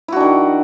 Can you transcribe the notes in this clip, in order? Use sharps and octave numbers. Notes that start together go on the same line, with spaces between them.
D#3 D4 E4 F#4